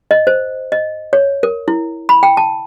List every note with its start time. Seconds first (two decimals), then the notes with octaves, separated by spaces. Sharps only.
0.11 D#5
0.27 C5
0.72 D#5
1.13 C#5
1.43 A#4
1.68 E4
2.09 B5
2.23 G5
2.37 A5